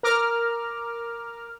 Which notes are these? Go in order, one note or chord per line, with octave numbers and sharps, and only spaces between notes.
A#4 A#5 D6 F6